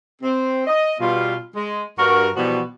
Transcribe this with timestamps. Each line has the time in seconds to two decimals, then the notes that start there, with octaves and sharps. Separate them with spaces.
0.22 C4
0.67 D#5
1.00 B2 G3 B3 F4
1.55 G#3
1.98 G2 F#4 A#4
2.35 B2 E3 F3 G3 B3 F#4